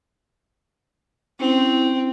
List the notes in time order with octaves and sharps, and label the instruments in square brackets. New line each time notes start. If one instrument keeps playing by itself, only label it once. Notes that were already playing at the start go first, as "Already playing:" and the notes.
[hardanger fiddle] C4 [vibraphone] C#4 E4